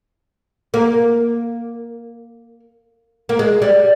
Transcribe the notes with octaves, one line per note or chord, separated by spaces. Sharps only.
A#3
A#3
G#3
G3